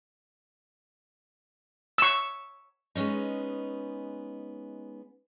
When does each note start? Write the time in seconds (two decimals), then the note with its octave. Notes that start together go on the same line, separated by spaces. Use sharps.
1.98 C#6 E6
2.95 G#3 B3 C#4 D#4